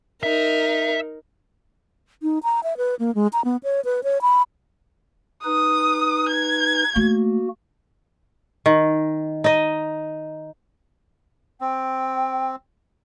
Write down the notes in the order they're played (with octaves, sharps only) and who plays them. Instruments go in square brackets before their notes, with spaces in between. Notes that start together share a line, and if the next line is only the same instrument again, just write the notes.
[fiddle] D#4 A#4 [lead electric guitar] E5
[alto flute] D#4
A#5
E5
B4
A#3
G#3
A#5
B3
C#5
B4
C#5
B5
[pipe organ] D#4 B4 [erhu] D#6
[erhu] G#6
[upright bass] A3 [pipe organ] A#3 F#4
[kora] D#3
D#4 D#5
[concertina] C4 [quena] G5